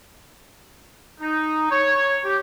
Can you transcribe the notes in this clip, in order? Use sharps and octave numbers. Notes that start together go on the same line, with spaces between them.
D#4
C#5
G4